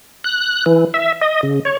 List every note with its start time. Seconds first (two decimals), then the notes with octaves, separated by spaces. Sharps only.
0.24 F#6
0.66 E3
0.94 E5
1.21 D#5
1.43 C#3
1.65 C#5